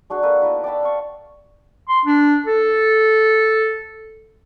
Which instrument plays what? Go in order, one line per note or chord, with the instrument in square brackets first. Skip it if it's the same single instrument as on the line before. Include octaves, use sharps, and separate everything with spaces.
[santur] G#3 D4 F#4 G#4
A#3 F#4 A4 B4
B3 D#4 E4
D5 G5 A5 B5
F5 C#6
[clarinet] C6
D4
A4